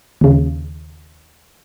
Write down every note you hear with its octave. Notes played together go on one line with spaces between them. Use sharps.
D#2 C#3